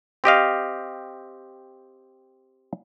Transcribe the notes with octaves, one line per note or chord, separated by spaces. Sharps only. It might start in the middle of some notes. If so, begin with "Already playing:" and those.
C4 G4 D#5 F5